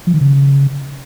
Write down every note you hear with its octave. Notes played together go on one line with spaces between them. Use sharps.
F3
D#3
C#3